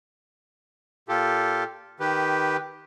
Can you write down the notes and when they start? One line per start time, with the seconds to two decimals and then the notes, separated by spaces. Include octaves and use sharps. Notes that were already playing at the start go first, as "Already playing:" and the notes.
1.08 A#2 F4 G4 A4
2.00 D#3 G4 B4